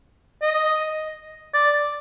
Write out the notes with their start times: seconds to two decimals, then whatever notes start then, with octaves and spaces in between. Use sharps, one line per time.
0.42 D#5
1.54 D5